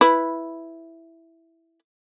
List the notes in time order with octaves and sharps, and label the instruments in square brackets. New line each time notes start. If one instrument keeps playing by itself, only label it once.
[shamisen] E4 B4